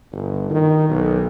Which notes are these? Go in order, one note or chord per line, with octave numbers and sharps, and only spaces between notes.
G1
D#3
B1